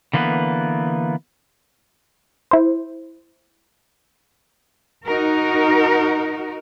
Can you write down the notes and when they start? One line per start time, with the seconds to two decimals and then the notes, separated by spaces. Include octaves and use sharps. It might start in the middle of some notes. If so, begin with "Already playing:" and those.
0.13 D3 E3 A#3 B3 B4
2.51 E4 C5
5.05 D#4 F#4 A#4